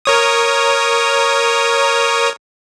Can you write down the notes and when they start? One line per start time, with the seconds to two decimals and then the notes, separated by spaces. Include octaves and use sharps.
0.05 A#4 C#5 D#6